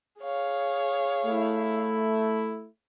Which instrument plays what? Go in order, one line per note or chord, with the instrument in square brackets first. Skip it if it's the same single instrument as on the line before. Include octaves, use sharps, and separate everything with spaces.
[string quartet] G#4 C#5 F5
[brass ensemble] A3 E4